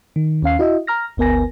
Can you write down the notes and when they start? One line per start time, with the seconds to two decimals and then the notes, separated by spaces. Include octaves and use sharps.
0.16 D#3
0.42 D#2 C#4 F5 C7
0.59 E4 F#4 D#5 E5
0.87 A#5 F6 A#6
1.17 G1 D2 B3 A#4 G#5 A#6